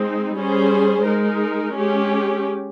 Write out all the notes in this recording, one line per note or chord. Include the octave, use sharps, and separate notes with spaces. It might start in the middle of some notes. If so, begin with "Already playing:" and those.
Already playing: G#3 C4 D#4
G3 C#4 G#4 C5
G#3 D#4 A#4
G#3 C#4 G4